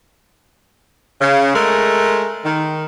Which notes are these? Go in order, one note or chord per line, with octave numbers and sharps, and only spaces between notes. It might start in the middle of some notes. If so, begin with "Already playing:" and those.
C#3
G#3 A3 A#4
D#3